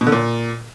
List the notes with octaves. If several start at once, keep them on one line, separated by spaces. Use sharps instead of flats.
B2
D3
A#2